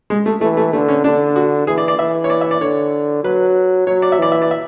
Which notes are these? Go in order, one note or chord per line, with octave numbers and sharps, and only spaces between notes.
G#3
A3
E3 A3
A3
D3 A3
C#4
D3 D4
F#4
E3 G#4
D5
D5
E3 E5
C#5
D5
E5
D5
D3 C#5
F#3 B4
F#3 C#5
D5
E5
E3 D5
E5
D5
E5